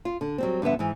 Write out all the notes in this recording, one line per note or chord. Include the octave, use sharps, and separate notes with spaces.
F4
D3
F#3 G3 C4
G2 D3 F3 B3 E5
G#2 E3